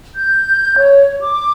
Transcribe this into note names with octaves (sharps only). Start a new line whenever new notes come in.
G6
C#5
D6